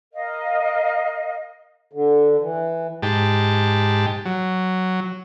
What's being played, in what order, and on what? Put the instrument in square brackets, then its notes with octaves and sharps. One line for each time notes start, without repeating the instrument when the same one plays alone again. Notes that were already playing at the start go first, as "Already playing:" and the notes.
[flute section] A#4 D#5 F5
[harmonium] D3
E3
[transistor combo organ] G#2 G4 A5
F#3